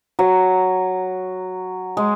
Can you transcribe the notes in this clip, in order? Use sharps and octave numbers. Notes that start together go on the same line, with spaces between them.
F#3
G#3